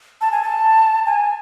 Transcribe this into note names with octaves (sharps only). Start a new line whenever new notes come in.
A5
G#5
A5
G#5